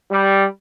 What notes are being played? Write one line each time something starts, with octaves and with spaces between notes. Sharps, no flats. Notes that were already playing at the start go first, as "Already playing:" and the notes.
G3